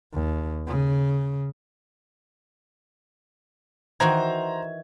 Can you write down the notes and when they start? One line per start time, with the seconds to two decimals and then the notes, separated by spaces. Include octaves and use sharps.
0.13 D#2
0.67 C#3
4.00 D#3 E3 F#4 C5 A#5 G#6